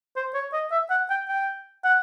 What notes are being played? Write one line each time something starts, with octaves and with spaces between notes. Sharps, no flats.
C5
C#5
D#5
E5
F#5
G5
G5
F#5